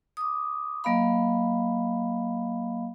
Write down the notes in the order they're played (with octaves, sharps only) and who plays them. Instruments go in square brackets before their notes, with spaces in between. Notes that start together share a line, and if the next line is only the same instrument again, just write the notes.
[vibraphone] D6 D#6
F#3 A#3 D#5 F5 B5